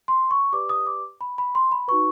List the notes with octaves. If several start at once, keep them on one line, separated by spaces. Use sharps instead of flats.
C6
C#6
G4 B4 D5 D6
D#6
D6
B5
B5
C6
B5
D#4 F#4 B4 C#6